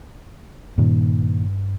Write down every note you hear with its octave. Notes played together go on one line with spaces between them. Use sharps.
G2 A#2 D#3